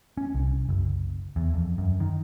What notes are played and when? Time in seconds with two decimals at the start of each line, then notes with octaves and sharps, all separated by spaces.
0.17 C#4
0.34 C2
0.69 F#1
1.36 E2
1.54 F2
1.78 F#2
2.00 D#3